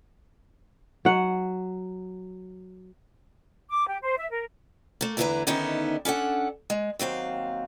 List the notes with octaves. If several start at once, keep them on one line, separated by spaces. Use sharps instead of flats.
F#3 F#5
D6
G4
C5
E5
A#4
A3 A#3
E2 D3 E4 A4 B4 A#5
D3 D#3 B3 C#4 D#4 E4
C#4 D4 A4 F#5
G#3
D#2 F#3 C4 F5